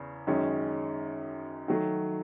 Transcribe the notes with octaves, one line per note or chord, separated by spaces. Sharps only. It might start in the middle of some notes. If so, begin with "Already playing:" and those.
Already playing: E2 C#3
F#2 D#3 G#3 C#4
D#3 F#3 A3